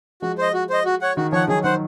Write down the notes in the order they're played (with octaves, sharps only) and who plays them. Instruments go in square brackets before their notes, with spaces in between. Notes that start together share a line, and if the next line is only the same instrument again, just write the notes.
[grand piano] F3 G#3 [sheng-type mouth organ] F#4
[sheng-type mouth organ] C5 D#5
F#4
C5 D#5
F#4
C#5 F#5
[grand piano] D#3 [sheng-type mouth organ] F#4
[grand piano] F3 [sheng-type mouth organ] C#5 F#5
[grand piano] D#3 F#3 [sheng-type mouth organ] G#4
[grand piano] D#3 F#3 [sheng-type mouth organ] C5 F#5